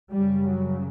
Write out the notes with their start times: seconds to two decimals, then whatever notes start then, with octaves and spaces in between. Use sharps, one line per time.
0.11 F#2 C#3 G3
0.48 F#3